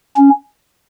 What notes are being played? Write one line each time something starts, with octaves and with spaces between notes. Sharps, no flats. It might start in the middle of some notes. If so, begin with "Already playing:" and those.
C#4